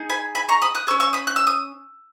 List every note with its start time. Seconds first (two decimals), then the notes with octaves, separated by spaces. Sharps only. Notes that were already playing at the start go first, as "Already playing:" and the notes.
Already playing: D#4 G#4
0.10 G#5 B5
0.35 G#5 B5
0.49 A#5 C#6
0.62 B5 D#6
0.75 D#6 F#6
0.87 C#4 G#4 C#6 E6
1.00 C#6 E6
1.13 B5 D#6
1.27 F#6
1.36 E6
1.47 D#6